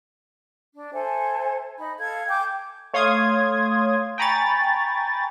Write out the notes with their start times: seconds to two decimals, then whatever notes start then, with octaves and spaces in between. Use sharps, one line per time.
0.74 D4
0.93 A4 C5 E5 G#5
1.78 D#4 B5
1.98 A4 F5 G#6
2.28 G5 G#5 D6 G6
2.93 A3 C#5 F5 C6 D#6 G#6
4.18 G5 G#5 A#5 B5 C#6 A6